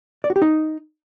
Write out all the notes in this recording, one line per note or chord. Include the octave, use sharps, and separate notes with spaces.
D5
F#4
G4
D#4